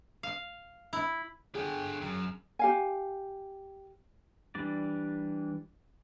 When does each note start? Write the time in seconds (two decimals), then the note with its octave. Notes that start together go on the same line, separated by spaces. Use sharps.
0.23 F5
0.93 E4
1.55 D3 G4 G#4
2.01 F#2
2.59 G4 F5 G#5
4.55 E3 G3 D4 D5